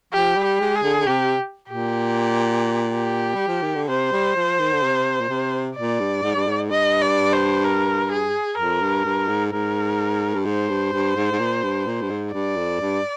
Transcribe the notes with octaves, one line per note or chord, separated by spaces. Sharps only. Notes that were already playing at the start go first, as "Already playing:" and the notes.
F3 G4
G3
G4
G#3
G#4
D3
D3
C3 G4
A#2 G4
G4
G3
F3
D#3
D3
C3 C5
G3
F3
D#3
D3
C3
A#2
C3
A#2 D5
G2
G#2
G2
G#2
G2 D#5
D5
C5
A#4
G#4
F2 A#4
G2
G2
G#2
G#2 A#4
G2
G#2 C5
G2
G2
G#2
G#2
A#2
G2
A#2
G2
G#2
G2 D5
F2
G2